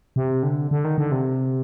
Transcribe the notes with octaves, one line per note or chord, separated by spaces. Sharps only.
C3
D3
D3
D#3
D3
C3